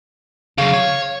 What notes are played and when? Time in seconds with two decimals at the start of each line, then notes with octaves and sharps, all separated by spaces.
0.58 C#3 F#3 F5
0.74 C#5